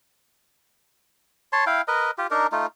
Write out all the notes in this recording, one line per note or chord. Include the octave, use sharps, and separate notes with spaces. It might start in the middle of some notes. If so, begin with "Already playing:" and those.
C#5 A5 C6
E4 F5 G5
A#4 B4 D#5
F4 G4
D4 D#4 A#4
A3 D#4 F4